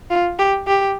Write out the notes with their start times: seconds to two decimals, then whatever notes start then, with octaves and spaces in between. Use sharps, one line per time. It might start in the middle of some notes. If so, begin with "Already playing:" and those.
0.10 F4
0.39 G4
0.67 G4